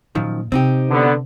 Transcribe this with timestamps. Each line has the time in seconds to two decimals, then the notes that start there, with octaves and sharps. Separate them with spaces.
0.15 F#2 A#2 D#3 F3
0.52 C3 C4 D#4 G4
0.89 D3 B3